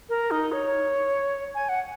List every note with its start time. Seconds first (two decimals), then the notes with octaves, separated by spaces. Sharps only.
0.09 A#4
0.31 D#4
0.52 C#5
1.55 G#5
1.69 F#5